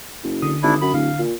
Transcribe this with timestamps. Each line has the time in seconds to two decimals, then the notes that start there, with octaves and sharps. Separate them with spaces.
0.24 F#1
0.42 D3 D#6
0.63 G#1 D4 E4
0.81 F#2 B5
0.94 D1 D3 F5
1.19 A#2